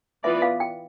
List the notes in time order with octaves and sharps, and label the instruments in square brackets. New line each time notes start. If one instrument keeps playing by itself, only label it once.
[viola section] E3 B3 F4 B4 D5 [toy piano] E5
[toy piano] F5
G5